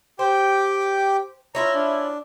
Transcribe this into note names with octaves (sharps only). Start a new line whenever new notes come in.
G4 C5 G5 D6
C#4 E4 F4 A#5
D4